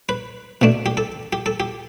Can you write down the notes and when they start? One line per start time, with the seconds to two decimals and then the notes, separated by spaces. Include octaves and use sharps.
0.09 B4
0.62 B2 A3 D4
0.86 G4
0.97 A4
1.33 G4
1.46 A4
1.60 G4